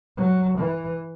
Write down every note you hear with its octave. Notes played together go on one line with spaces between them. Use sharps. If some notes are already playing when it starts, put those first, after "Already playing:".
F#3
E3